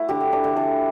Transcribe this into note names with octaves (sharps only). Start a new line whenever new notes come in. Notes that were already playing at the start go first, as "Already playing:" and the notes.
Already playing: F#3 A3 E4
D3 G4
E3
E3 D4
D3
E3 D4